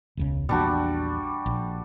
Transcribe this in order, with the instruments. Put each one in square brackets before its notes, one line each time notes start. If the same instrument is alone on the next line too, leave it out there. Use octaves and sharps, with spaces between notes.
[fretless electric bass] E1 C#2 C#3
[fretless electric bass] A#1 E2 A#2 [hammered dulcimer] G3 D4 F#4
[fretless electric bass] A#1